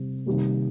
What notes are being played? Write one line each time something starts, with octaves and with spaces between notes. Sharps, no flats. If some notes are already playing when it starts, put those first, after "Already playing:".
Already playing: C3 G3 C4
C3 D#3 G3 A#3